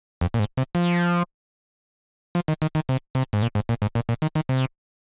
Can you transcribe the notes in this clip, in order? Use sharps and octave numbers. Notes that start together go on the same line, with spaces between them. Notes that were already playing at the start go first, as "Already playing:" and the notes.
F2
A#2
G#2
C3
F3
F3
D#3
D#3
D#3
C3
C3
G#2
A#2
G#2
A#2
G#2
A#2
A#2
D#3
D#3
C3